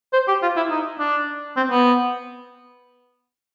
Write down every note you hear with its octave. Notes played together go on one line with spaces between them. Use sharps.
C5
G4
F4
E4
D#4
D4
C4
B3